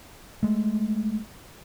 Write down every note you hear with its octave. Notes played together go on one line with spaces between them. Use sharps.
G#3 A3